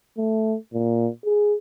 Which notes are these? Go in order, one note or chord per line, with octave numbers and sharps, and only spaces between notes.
A3
A#2
G#4